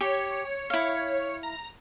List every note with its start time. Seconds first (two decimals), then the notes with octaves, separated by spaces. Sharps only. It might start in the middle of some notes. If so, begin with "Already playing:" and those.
0.01 G4 C#5
0.70 E4 F5
1.43 A#5